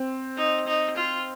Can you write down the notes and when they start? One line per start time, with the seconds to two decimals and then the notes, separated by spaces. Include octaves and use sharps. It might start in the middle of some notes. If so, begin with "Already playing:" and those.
Already playing: C4
0.37 D#4
0.67 D#4
0.97 F4